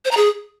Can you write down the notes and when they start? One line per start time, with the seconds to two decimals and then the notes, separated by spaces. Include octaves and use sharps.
0.05 C5
0.11 A#5
0.17 G#4